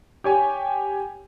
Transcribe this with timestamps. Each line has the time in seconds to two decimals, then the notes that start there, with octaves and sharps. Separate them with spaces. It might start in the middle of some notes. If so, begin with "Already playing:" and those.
0.24 G4 C#5 G#5